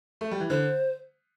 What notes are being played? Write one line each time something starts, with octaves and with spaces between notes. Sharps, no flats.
A3
G3
E3
D3 C5